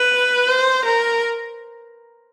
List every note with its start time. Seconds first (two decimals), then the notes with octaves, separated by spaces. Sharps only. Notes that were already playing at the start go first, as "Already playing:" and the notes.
Already playing: B4
0.49 C5
0.85 A#4